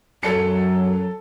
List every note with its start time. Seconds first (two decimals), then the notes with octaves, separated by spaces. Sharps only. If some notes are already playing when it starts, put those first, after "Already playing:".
0.23 F#2 F#3 A4 C#7